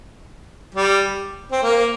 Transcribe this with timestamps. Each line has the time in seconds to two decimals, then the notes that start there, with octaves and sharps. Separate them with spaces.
0.75 G3
1.52 C4
1.62 A#3